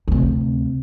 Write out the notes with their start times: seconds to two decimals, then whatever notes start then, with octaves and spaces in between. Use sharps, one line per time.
0.08 D2 C3